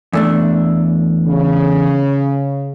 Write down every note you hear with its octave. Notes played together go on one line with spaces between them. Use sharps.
E2 A3 D4
C#3